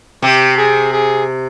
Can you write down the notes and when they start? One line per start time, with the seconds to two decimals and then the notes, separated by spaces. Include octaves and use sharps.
0.23 C3 G4
0.58 G#4
0.93 G#4